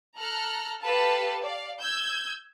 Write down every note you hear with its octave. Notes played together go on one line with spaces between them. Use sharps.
A4 A#5 F6 F#6
G4 A4 B4 F5 A5
D5 F5
E6 G6 G#6